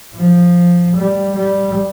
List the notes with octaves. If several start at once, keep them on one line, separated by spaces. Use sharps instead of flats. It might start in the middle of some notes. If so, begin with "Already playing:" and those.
F3
G3
G3